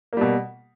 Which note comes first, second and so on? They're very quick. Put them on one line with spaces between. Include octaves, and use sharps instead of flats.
A#3 G3 B2